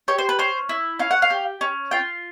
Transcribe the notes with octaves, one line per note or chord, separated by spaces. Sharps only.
G4 C#5
C5
B4
C#4 C5
E4
C#4 F5
F#5
F5
G4
C#4
F4 G5